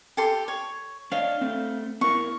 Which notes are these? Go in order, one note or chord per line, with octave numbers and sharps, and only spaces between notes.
G4 A4 C6
C#5
D4 C#5 D#5 F5
A3 C4
B3 E4 A#4 C#6